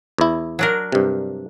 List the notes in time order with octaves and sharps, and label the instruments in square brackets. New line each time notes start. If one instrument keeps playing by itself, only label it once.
[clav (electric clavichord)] E2 E4
[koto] F#3 D4 A#4
[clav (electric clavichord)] G2 C3